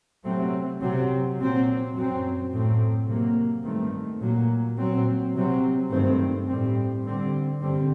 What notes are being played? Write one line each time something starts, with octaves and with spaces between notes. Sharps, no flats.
C3 F#3 A3 C4
C3 F#3 C4
A#2 F#3 C4
F#2 F#3 C4
A2 F#3 A3 C4
C3 F#3 A#3
G2 D#3 A3 C4
A#2 F#3 A#3
A#2 F#3 C4
C3 F#3 C4
G2 D#3 A3 C4
A2 G3 C4
D3 G3 C4
G2 D3 G3 C4